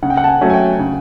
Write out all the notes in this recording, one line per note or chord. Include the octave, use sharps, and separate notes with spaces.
C#3 F#5
G5
F#5
A5
G#5
F#3 A3 C#4
G#5
G5
C#3